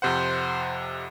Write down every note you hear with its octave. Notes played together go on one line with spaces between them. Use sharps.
F2 C3 C5 F#5